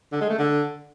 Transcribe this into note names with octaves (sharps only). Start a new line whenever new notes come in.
D3
G#3
A3
D3